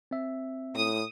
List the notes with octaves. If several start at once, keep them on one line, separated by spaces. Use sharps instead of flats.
C4 E5
A2 D#6